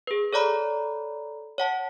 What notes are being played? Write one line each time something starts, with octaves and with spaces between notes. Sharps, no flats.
G#4 B4
A4 C#5 D5 A#5 B5
C#5 F#5 A5